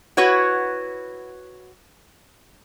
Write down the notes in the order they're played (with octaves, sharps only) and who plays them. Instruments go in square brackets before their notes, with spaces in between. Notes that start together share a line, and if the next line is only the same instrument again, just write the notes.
[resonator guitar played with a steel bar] E4 F#4 B4 C#5 F#5